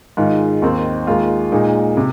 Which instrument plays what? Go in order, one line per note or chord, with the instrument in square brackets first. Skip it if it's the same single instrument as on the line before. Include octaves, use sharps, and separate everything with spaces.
[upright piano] G#2 D#3 G#3 F4
D#2 D#3 C4
D#2 D#3 G#3 F4
A#2 G#3 D#4
C3